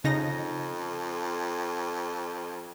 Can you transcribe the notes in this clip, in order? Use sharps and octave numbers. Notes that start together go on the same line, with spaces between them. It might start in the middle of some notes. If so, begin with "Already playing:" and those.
F2 C#3 D#4 A#6